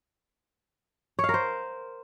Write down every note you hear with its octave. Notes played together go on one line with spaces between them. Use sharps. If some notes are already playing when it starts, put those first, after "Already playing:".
C#5
F5
A#4
C5